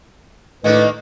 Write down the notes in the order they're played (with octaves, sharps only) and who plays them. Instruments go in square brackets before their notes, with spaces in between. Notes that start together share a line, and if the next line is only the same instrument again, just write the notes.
[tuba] A2 [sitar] D#3 A#3 D4 [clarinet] B4 [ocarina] D#5